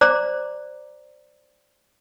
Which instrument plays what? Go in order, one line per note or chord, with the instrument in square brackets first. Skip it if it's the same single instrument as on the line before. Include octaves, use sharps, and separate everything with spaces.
[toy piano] C5 D5 A#5 D6